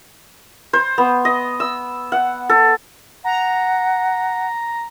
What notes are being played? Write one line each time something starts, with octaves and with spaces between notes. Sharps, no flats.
C5
B3
D#5
E6
F#5
A4
F#5 A#5